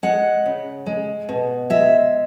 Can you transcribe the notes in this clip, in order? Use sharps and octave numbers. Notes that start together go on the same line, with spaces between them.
G#3 F#5
C#3
G#3
B2
G#3 E5